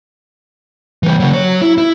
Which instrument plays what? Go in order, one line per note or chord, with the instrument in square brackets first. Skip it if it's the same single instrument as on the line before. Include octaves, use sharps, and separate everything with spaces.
[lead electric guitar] E3 G3
C#3 F#3
F#3 C#5
E4
E4